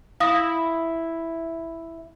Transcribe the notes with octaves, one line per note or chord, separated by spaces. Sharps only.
E4 F5 D#6 A#6